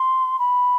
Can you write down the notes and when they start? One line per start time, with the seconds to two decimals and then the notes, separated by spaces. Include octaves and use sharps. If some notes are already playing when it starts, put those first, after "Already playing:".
Already playing: C6
0.39 B5